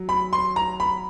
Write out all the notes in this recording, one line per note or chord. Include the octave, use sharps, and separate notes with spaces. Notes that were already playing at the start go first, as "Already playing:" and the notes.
Already playing: F#3
B5
C6
A#5
B5